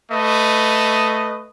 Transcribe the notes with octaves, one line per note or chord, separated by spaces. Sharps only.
A3 B4 D#5